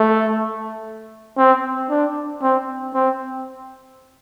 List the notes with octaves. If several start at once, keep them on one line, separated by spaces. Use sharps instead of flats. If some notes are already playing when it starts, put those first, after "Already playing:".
Already playing: A3
C4
D4
C4
C4